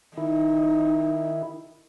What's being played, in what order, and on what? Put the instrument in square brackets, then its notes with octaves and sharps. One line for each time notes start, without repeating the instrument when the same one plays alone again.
[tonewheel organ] D#3 E4 [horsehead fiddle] D#4